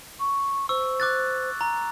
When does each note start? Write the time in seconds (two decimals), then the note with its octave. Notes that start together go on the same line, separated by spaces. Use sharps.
0.20 C#6
0.69 C5 C#6 E6
1.00 D6 F#6 A6
1.61 A#5